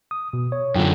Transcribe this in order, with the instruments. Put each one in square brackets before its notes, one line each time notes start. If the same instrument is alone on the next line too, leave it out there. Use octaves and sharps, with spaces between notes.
[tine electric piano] D#6
B2
C#5
[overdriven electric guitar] F#2 D3 [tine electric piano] D4 F4 G5